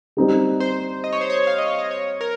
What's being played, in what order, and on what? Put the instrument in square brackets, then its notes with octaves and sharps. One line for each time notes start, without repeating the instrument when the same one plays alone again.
[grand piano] G3 C4 D#4 G4
[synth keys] C5
D#5
C#5
C5
C#5
F5
D#5
C#5
D#5
C#5
A#4